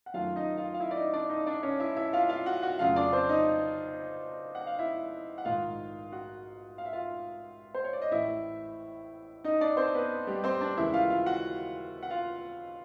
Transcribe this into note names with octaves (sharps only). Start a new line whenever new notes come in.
F#5
F#2 D#3 F#3 A3 F4 F5
D#4 D#5
F4 F5
F5
E4 E5
D5
D#4 D#5
D4 D5
D#4 D#5
D4 D5
C#4 C#5
E4 E5
E4 E5
F4 F5
F4 F5
F#4 F#5
F#4 F#5
F1 F2 C#3 F#3 A3 F4 F5
D4 D5
C4 C5
D#4 D#5
F#5
F5
E4 E5
F#5
A#1 G#2 D#3 F4 F5
F#4 F#5
F5
E5
F4 F5
C5
C#5
D5
D#5
A1 A2 E3 E4 E5
D#4 D#5
D4 D5
C4 C5
B3 B4
G3 G4
C4 C5
D4 D5
D#2 C#3 E3 G#3 E4 E5
F4 F5
F4 F5
F#4 F#5
F#5
F4 F5